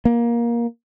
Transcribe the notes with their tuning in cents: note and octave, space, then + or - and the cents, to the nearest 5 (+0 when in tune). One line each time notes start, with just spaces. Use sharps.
A#3 +15